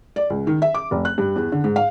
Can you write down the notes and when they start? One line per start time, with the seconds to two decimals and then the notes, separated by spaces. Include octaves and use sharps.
0.16 D5
0.30 C#2
0.47 D#3
0.62 E5
0.74 D6
0.91 F1
1.05 F#6
1.18 G2
1.36 E2
1.52 D3
1.64 G#2
1.76 F5